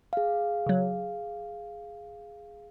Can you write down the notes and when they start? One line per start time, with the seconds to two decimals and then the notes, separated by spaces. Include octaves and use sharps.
0.13 G#4 F5
0.66 C#3 F#3